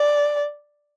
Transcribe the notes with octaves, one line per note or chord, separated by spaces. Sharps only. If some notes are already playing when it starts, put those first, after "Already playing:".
Already playing: D5